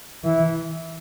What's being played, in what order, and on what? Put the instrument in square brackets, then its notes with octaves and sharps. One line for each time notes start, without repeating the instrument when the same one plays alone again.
[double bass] E3 [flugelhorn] E4